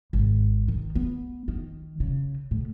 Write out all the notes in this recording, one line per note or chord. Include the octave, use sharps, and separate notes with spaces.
G#1
D#3
B3
D#3
C#3
A2